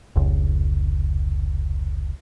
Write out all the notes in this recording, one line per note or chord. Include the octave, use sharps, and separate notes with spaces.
F1 C#2